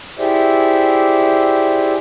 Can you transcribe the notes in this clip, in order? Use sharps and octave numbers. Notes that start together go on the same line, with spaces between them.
E4 G4 G#4 C5 D5 E5